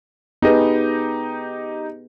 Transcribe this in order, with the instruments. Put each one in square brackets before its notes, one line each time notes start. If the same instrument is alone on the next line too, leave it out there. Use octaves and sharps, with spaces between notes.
[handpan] B3 G#4 B4 [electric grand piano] D#4 G4 D#5